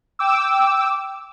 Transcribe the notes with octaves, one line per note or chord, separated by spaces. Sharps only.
G5 D6 E6